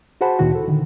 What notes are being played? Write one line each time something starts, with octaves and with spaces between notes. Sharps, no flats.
F#4 G#4 C5 F#5 A5 B5
D2 A#2 D#3 E4 F#4
A4
D3 D#3